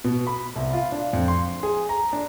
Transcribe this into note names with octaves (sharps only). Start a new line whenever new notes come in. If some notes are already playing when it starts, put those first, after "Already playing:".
B2
B5
C2
F4
D4
F2
C6
G#4
A#5
D4